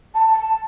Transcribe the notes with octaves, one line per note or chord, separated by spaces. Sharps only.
A5
A5